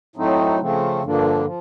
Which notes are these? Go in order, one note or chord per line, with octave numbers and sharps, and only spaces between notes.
A2 F#3 A3 C4 D#4
C#3 F3 A3 C4
G2 D3 F3 A#3 D4
F3